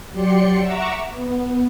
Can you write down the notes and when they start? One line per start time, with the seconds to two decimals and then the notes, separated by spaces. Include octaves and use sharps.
0.13 F#3 G4 D5 C6 C#7
0.59 E5 F#5 A#5 C#6 D6 E6
1.10 B3